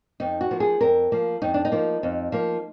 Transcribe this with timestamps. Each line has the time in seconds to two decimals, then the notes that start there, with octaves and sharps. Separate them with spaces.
0.20 F2 D#4
0.41 F#4
0.51 F3 A#3
0.60 G#4
0.81 F2 A#4
1.12 F3 A#3
1.42 F2 D#4
1.54 D4
1.65 D#4
1.72 F3 A#3
2.03 F2
2.32 F3 A#3